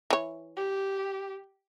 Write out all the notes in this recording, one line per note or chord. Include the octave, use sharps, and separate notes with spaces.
E3 C#5
G4